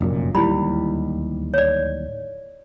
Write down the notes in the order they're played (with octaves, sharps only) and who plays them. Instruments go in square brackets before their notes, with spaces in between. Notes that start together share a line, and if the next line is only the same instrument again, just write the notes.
[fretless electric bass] F1 F#2 A#2
[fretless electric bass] D1 D#2 G3 [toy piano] E4 B5
[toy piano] C#5 D5